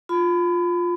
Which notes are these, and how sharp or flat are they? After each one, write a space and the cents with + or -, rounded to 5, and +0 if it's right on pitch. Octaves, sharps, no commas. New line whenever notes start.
F4 +10 B5 +30